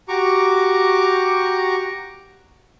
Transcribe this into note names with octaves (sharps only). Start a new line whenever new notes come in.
F#4 G4 A#5 C#6 D6